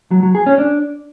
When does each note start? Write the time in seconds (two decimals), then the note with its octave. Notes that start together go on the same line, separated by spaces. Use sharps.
0.11 F#3
0.23 F#3
0.35 G#4
0.46 C#4
0.58 D4